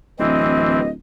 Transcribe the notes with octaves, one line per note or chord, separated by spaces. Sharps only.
D1 E3 C4 D#5